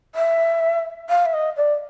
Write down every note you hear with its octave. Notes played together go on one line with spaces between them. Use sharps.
E5
F5
E5
D#5
D5